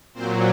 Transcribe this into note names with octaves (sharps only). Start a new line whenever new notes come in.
A#2 F#3 C4 C5